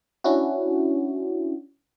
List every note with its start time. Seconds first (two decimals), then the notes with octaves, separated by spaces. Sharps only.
0.24 C#4 D4 E4 F#4